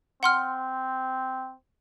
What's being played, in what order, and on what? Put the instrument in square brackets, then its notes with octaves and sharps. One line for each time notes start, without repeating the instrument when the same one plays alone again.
[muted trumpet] C4 [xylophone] F#5 C6 F6